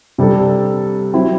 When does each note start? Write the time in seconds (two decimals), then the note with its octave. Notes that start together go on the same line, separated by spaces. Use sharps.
0.18 C3 G3 D4 A4
1.13 F#3 C4 E4